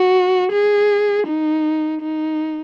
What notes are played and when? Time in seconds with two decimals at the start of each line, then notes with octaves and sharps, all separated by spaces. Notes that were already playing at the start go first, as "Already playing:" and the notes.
Already playing: F#4
0.52 G#4
1.27 D#4
2.02 D#4